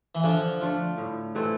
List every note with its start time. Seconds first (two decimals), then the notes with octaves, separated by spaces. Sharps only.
0.15 E3
0.23 D3 F3
0.61 A3 D4 F4
0.98 A2
1.35 E3 A3 C4